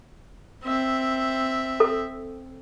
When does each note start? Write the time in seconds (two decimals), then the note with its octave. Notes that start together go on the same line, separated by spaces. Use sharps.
0.63 C4 E5
1.80 A4